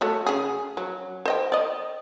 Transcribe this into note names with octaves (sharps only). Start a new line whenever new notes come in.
A3 F#4 C#5
C#3 G#4
F#3
C5 D#5 G5
D5 D#5